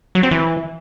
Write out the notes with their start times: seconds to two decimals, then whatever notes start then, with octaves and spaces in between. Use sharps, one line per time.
0.15 F#3
0.23 C4
0.31 E3